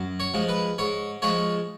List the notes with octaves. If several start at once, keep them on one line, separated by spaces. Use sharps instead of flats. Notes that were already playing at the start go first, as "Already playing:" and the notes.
Already playing: F#2
C#5
F3 G#3
B4
G#2 C#5
F3 G#3 C#5